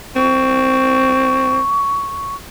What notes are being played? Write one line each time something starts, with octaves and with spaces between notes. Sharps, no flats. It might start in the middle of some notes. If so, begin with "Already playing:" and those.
C4 C#6